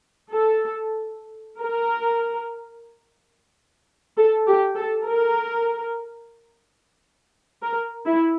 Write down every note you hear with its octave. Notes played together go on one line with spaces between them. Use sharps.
A4
A#4
A4
G4
A4
A#4
A#4
E4